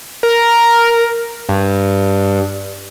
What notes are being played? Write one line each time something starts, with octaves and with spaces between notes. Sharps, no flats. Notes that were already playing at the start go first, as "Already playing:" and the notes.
A#4
G2